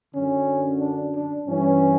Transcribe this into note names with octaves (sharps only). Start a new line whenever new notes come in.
F#2 D3 C#4
D4
D4
G2 E3 C#4